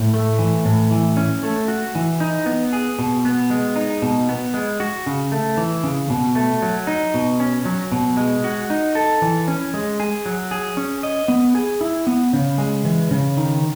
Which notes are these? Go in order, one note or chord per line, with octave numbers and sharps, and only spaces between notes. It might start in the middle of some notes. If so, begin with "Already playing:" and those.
Already playing: A2
A3
E3
A2
E3
C#4
A3
F#4
E3
D#4
B3
G#4
B2
B3
G#3
D#4
B2
B3
G#3
F#4
C#3
A3
E3
C#3
B2
A3
F#3
D#4
B2
C#4
F#3
B2
G#3
F#4
D#4
A4
E3
C#4
G#3
G#4
F#3
G#4
C#4
D#5
B3
G#4
E4
B3
C#3
G#3
E3
C#3
D#3